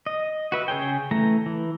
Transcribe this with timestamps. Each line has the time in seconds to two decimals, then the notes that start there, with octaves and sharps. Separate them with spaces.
0.06 D#5
0.52 F#4 B4 E5
0.68 C#3 G#4 C#5 G5
1.11 E3 A3 A#5
1.46 E3